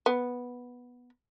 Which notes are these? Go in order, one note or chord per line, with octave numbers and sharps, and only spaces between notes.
B3